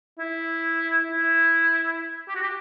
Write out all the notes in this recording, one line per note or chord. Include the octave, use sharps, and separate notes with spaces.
E4
E4
G4
F#4
G4